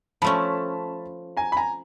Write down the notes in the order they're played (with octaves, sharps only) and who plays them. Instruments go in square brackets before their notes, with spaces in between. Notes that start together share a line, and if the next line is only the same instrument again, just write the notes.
[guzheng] F3 A3 C#4 [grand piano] A5 B5
[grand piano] G#5 A#5
B5
G#5 A#5